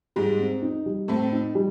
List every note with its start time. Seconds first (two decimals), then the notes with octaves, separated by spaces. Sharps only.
0.16 G#2 G3 G#3
0.39 C4
0.62 D#4
0.86 G3
1.08 A2 A3 C4
1.32 D#4
1.55 G3